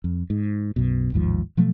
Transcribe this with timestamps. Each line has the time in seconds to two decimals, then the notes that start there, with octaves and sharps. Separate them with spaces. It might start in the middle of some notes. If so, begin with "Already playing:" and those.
0.04 F2
0.30 G#2
0.76 B1 F#2 B2
1.12 A1 D#2 G#2 F3
1.57 B2 F3 F#3 A3